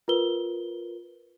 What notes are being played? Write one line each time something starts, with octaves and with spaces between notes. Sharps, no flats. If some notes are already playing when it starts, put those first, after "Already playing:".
F4 A#4 B4 G7